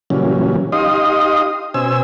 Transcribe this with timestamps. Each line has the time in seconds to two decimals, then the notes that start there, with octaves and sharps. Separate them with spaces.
0.10 A#2 C#3 E3 F#3 G3 C#4
0.72 D#4 G4 D#5 F5 C6 D#6
1.74 B2 C#4 C5 G#5 E6